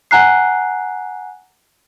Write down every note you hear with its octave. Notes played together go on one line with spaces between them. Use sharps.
F#5 G#5 A#5 F#6 C7